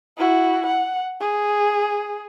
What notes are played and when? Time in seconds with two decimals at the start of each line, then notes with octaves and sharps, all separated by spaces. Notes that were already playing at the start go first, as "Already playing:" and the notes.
0.18 E4 F#4
0.66 F#5
1.20 G#4